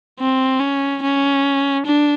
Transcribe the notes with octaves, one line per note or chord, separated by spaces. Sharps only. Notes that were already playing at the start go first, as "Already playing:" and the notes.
C4
C#4
C#4
D4